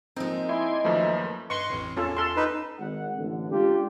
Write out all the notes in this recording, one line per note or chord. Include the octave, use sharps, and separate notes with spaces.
F3 G#3 A#3 C4 D#4
E4 D5 G#5 C6
F#2 D#3 F3 A3 A#3 B4
G2 B4 D#5 C6 C#6
A1 F2 A2
E2 C#4 F4 A4
A4 C6
D#4 B4
G#1 F#5
A1 D3
G#3 C#4 D4 F4 G4